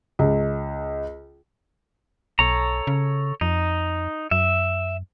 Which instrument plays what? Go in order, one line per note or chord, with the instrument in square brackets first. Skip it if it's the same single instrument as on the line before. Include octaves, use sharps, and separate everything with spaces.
[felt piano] C#2
[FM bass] B1 [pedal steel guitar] A4 C#5 A#5
[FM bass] C#3
[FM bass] F2 [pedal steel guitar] D#4
[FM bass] F#2 [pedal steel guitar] E5